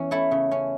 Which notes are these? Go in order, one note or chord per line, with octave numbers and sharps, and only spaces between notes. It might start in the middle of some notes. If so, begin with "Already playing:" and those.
Already playing: E2 E3 C#4
A3 E4 A4
C#3
C#4